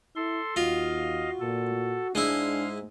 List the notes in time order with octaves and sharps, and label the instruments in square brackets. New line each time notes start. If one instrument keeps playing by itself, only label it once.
[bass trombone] E4 [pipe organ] A4 C6
[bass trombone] D#2 [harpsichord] F4 [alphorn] F#4 [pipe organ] D#5 F5
[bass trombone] A#2 [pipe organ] A4
[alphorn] G#2 [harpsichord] G#3 E4 [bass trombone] D4 [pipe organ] F5